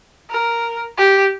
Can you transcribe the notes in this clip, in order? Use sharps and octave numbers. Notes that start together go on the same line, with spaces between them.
A#4
G4